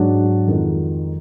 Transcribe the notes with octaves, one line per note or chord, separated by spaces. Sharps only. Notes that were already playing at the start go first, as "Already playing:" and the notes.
Already playing: G#2 F#3 D4 F#4
F2 D#3 G#3 D#4